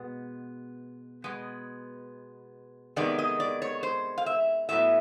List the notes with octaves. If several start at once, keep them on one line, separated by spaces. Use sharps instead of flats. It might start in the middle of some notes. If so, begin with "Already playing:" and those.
Already playing: B2 G#3 B3
B2 G#3 B3
C3 D#3 G#3 B3 D5
D#5
D5
C#5
C5
F5
E5
A2 F#3 B3 E5